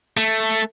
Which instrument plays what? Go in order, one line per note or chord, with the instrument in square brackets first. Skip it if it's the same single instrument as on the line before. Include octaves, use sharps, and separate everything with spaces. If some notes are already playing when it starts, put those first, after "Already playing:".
[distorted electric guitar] A3